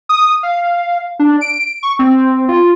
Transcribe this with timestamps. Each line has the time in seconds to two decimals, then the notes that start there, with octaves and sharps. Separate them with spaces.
0.09 D#6
0.43 F5
1.19 D4
1.41 D7
1.83 C#6
1.99 C4
2.49 F4